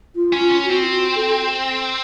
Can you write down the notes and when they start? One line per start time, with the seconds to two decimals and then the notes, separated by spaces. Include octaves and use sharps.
0.15 F4
0.33 C#4
0.39 F4
0.52 C#4
0.64 F#4
0.70 C4
0.80 F4
0.89 F#4
1.15 A4